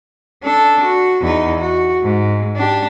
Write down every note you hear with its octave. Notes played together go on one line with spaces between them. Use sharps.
D4 A4
F#4
E2 D#4
F#4
G#2
D4 G4